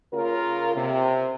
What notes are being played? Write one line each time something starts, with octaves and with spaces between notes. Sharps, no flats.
C#3 A#3 F4 A#4
C3